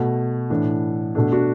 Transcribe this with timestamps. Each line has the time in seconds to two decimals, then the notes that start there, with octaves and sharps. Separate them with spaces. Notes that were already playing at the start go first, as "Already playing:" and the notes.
Already playing: B2 A3
0.50 A2 E3 A3 D4
1.15 B2 A3 D4
1.32 D4 F#4